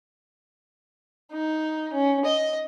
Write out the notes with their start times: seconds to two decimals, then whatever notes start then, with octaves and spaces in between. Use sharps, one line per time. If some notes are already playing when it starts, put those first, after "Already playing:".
1.32 D#4
1.93 C#4
2.25 D#5